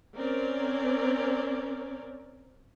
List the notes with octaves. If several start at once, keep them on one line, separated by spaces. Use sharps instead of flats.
C4 C#4 A#4 D5